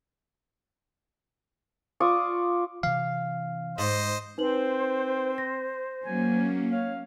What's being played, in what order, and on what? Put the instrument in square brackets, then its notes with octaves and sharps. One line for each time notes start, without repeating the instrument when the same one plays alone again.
[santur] F4 D5 C#6 D#6
[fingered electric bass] C3 E3 [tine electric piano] F5
[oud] G#2 [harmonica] C5 D#5
[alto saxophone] C4 [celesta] D#4 B4 F#7 [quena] C5
[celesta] A#6
[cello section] F#3 A#3 C#4 [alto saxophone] G#5
[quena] C#5 [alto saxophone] F5